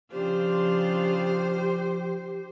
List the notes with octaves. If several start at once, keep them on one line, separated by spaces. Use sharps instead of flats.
C#3 F3 D4 F4 G4 C5